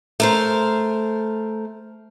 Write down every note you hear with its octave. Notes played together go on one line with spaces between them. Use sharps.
A3 A#4 C5